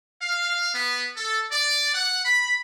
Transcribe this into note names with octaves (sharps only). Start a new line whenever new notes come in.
F5
B3
A4
D5
F#5
B5